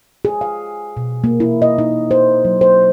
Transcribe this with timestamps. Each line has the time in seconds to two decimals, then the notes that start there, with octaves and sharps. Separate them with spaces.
0.25 G#4
0.41 F5
0.97 B2
1.24 A#3
1.40 E4
1.62 D#5
1.78 D#4
2.11 C5
2.45 F#3
2.61 C5